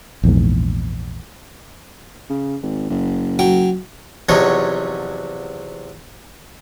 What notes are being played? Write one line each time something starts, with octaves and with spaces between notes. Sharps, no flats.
A#1 E2 G#2
C#3
G#1
F#1
F#3 G5
E2 C3 F3 F#3 D#4 C#5